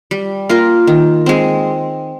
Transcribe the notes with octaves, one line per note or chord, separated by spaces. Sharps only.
G3
A#3 F4 A#4
D#3
G#3 C4